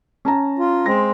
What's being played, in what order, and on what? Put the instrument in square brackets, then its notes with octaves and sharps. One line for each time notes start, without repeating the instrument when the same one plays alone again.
[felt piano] C#4 A5 A#5
[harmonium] F4
[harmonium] G#3 C4 [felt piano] A#6